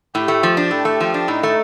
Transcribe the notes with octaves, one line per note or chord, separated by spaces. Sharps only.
A2 G4
A3
F3
D4
A2 A4
A3
F3 G4
D4
A2 D#4
A3